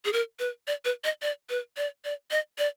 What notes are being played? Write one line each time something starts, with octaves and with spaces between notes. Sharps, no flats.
G#4
A#4
B4
D5
B4
D#5
D5
B4
D5
D5
D#5
D5